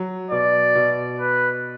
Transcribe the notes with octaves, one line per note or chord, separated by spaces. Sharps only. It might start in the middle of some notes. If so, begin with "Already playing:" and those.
Already playing: F#3
B2 D5
B2
B4